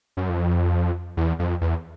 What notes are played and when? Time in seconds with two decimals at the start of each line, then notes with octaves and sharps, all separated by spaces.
0.17 F#2
0.29 F2
1.17 E2
1.39 F2
1.61 E2